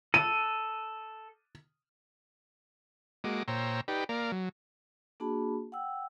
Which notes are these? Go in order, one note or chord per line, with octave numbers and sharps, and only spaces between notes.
A4 D#7
G#3 A#3 F#4 D#5 D6
A#2 C5 C#5 G5 A#5 E6
D#4 G4 B4 D5 G5
A#3 A#4 D5 F5
F#3
A#3 D4 F#4 G#4 A5 B5
F#5 G5 E6